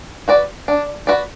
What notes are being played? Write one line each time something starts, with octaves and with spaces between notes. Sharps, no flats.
F#4 B4 D5
D4
F#4 B4 D5